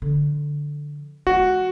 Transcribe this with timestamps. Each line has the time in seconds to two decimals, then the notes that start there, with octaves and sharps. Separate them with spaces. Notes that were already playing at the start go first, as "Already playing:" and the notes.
0.02 D3 F3
1.27 E3 G#3 F#4